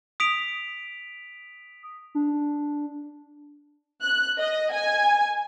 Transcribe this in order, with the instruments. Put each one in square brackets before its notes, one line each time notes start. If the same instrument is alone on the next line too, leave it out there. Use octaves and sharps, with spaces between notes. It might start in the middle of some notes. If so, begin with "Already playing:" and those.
[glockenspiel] D#6 B6 D7 F7
[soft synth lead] D4
[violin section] F#6
D#5
G#5